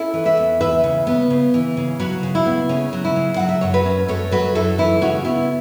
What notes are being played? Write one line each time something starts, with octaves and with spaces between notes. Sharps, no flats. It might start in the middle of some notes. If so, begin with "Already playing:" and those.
Already playing: C#4 E4 A4
E3
B4 E5
E2
E3 B4 E5
C#3
B3
C#3
E3
C#3
F#3 F#4 B4
C#3
E4
B3
C#3 C#4
F#3
E4
C#3
F#3 F#5
E5
F#2 C#5
F#4 B4
C#4
F#2 A4 C#5
F#3 F#4 B4
F#2 E4 A4
E3 E4
C#3 C#4 F#4
B3 E4